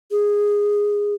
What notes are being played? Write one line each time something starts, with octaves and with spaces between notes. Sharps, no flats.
G#4